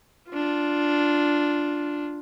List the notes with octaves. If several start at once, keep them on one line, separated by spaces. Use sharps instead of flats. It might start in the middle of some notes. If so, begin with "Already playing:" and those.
D4 F4